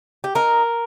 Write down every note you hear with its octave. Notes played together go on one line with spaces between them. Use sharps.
G4
D#4 A#4